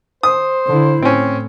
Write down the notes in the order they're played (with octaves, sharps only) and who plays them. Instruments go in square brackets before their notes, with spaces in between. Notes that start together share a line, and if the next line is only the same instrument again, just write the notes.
[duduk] C5 [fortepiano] D#6
[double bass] D3 E4
[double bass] A2 [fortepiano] C4 C#4